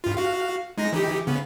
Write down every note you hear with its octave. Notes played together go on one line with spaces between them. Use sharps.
G2 F4
F#4 F5
G#3 D#4 A#6
E3 D#4 G4
C#3 B3